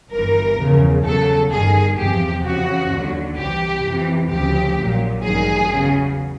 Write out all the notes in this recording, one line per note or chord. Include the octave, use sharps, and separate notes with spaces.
G1 G2 E3 A#4
E2 C#3 F3
E2 C#3 F#3 A4
G1 G2 D#3 G#4
E2 C3 F3 G4
F2 C#3 E3 F#4
D#2 D3 F#3
C2 C3 E3 G4
F2 C3 E3
D2 C#3 F3 G4
A#1 A#2 F#3
A1 G2 D#3 F#3 G#4
E2 C#3 F#3